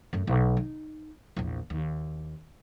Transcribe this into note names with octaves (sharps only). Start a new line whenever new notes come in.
F#2 A3
B1
D#4
A#1 E2
D#2